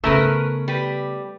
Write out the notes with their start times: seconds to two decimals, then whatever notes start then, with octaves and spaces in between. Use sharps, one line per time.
0.04 C#3 A3 B3 C#4 A#4 B4 E5
0.68 G3 B4